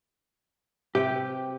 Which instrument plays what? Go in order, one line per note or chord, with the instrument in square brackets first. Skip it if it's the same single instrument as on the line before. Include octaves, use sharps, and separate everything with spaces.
[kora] C3 B4 G5 [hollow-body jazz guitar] G4